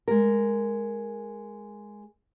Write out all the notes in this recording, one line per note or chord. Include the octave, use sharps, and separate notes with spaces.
G#3 A#4